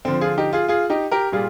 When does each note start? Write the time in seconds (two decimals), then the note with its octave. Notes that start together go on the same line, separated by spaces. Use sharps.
0.05 D3 F3 C4
0.21 F4 G#4
0.38 D#4 G4
0.53 F4 G#4
0.68 F4 G#4
0.90 D#4 G4
1.11 G4 A#4
1.32 A#2 G3 F4 G#4